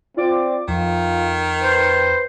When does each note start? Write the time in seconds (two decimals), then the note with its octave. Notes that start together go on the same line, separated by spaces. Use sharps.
0.17 C4 F4 D5 D6
0.68 F2 D#3 F4
1.63 B4 C5